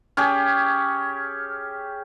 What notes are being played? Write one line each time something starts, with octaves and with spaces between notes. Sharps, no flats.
C#4 G4 G#4